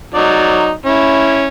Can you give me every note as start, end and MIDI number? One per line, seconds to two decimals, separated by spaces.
0.14 0.71 54
0.14 0.71 63
0.14 0.71 74
0.86 1.48 61
0.86 1.48 64